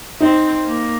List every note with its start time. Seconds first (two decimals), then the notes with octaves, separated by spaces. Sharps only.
0.20 C4 D#4
0.65 A#3